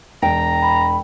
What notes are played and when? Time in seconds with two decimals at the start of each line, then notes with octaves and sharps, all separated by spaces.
0.22 E1 G5 A#5
0.62 B5